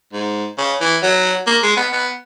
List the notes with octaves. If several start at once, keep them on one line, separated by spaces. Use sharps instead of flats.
G#2
C#3
E3
F#3
A#3
G#3
B3
B3